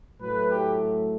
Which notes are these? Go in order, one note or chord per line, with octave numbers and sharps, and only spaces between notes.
A2 F#3 A3 B4
G4